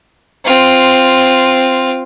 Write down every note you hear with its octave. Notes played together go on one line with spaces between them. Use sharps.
C4 F4